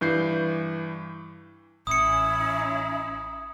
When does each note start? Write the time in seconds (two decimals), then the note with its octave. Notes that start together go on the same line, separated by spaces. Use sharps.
0.01 G2 E3 G6 C7
1.87 A1 C#4 E4 D#6 C#7